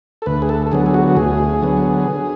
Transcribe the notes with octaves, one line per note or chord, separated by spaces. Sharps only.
A4
D2 B4
G#4
A4
A4
D3 F#3 B3 G#4
G#4
F#4
F#4
D2 G#4
D3 F#3 B3